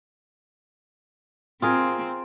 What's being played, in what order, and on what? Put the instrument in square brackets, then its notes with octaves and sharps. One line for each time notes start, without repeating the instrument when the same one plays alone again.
[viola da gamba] C4 [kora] F4 G#4 A#4